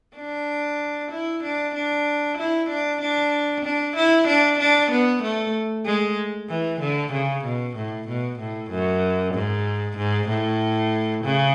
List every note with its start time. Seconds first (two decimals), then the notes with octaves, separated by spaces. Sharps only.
0.17 D4
1.11 E4
1.43 D4
1.75 D4
2.38 E4
2.69 D4
3.01 D4
3.65 D4
3.96 E4
4.28 D4
4.59 D4
4.91 B3
5.23 A3
5.86 G#3
6.49 E3
6.81 D3
7.12 C#3
7.44 B2
7.76 A2
8.08 B2
8.39 A2
8.70 F#2
9.34 G#2
9.97 G#2
10.29 A2
11.24 C#3